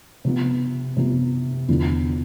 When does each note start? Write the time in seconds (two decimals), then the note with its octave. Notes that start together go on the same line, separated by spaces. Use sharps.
0.25 C3 F3 B3
0.97 C3 F3 B3
1.68 E2 D3 F3 B3